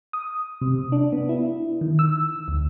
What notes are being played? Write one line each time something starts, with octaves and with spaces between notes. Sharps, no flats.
D#6
C3
D4
B3
E4
D#3
E6
D2